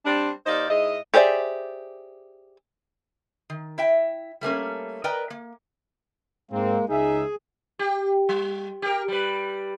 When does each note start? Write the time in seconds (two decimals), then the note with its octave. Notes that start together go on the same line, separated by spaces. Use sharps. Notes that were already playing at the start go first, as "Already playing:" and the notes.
0.05 G3 C4 D4
0.46 D#2 D#4 C5 D5 F5
0.69 G#2 G#3 E4 D#5
1.14 G4 G#4 C5 D5 E5
3.50 D#3
3.78 E4 E5 G5
4.41 G3 A3 A#3 C#4
5.04 A#4 B4 D5 D#5 G5 A#5
5.30 A#3
6.51 G#2 G#3 A#3 C4
6.89 C#2 D#4 G#4 E5
7.79 G4
8.29 G3
8.82 G4 A#4
9.08 G3 B4